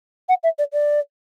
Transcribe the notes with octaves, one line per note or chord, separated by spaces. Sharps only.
F#5
E5
D5
D5